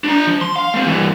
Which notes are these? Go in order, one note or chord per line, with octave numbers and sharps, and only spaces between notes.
D4 A#5
F3
C6
F5
A3 C4
G2 E3